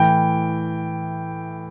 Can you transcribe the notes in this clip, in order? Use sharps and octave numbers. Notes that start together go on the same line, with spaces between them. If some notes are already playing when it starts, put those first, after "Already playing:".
Already playing: A2 E3 G5